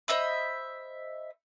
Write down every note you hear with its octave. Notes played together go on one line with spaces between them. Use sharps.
C5 D#5 E5 B5